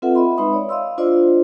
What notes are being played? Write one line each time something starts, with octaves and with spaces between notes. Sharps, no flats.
C4 F4 A4 B4 E5 F#5
D#5 E5 B5 C6
G#3 D#4 B4 E5 B5 D#6
C#5 D5
D#5 F5 C6 E6
D4 F4 C5 D5 D#5 C6